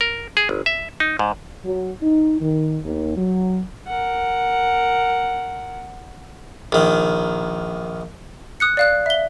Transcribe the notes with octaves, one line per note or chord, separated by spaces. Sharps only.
A#4
G#4
G1
E5
D#4
G#2
F#3
D#4
D#3
D#2
F#3
A#4 F#5
A#1 D#3
D#6 F#6 C#7
D5 F5 F#6
E5 G7